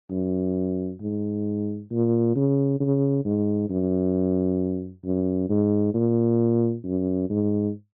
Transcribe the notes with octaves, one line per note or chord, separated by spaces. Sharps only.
F#2
G#2
A#2
C#3
C#3
G#2
F#2
F#2
G#2
A#2
F#2
G#2